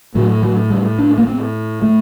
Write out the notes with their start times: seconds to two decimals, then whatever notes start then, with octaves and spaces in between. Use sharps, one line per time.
0.15 A2 F#3
0.42 F#3
0.70 G3
0.98 D4
1.18 A#3
1.27 C4
1.82 A3